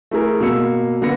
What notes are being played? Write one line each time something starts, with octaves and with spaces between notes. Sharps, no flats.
A3 E4 G#4 A#4
B2 A#3 E6 C#7
D3 A#3 B3 B4 A#6 C#7